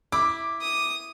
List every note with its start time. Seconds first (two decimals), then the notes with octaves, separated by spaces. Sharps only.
0.12 E4 D6
0.62 D#6